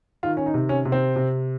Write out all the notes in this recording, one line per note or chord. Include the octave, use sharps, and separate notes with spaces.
D#3 F4
C#4
D#4
C3
C#4
C3
C4
C3